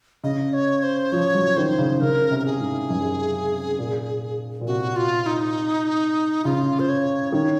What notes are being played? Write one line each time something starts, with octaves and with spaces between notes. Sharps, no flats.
C#3 D#5
C#5
C5
F3 C#5
F#3
D#3 C5
C#3
C#3 A#4
C3
A#4
G#4
G#2
F#2
A#2
A#2
C3 F#4
F4
D#4
C#3 F4
C5
C#5
D#3 C#5